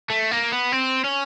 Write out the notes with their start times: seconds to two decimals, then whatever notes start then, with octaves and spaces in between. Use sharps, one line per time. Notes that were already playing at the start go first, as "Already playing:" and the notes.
0.10 A3
0.31 A#3
0.52 B3
0.72 C4
1.05 C#4